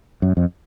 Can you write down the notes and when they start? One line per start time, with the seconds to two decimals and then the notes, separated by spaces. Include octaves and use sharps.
0.22 F#2
0.37 F2